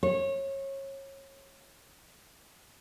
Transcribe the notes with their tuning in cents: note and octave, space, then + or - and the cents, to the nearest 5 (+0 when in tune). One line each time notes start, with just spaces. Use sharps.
C#5 -25